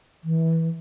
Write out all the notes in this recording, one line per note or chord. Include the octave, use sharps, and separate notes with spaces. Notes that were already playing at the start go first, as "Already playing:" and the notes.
E3